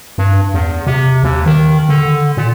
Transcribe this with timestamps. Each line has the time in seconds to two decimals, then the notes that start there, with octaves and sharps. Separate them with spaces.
0.18 G2
0.54 E2
0.86 C3
1.23 D#2
1.46 D#3
1.89 D3
2.37 A#2